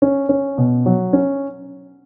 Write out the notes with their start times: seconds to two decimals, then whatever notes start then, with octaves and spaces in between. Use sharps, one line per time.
0.02 C#4
0.29 C#4
0.58 B2
0.86 F#3
1.13 C#4